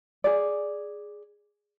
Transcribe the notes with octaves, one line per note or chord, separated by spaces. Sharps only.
G#4 D5